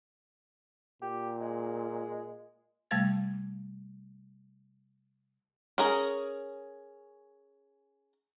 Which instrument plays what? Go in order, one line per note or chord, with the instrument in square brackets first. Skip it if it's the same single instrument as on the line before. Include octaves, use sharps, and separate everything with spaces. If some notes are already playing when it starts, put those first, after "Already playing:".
[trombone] A#2 [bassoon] G4
[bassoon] G#3
[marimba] C3 G3 A3 F5 G#6 A6
[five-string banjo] C#4 G#4 A#4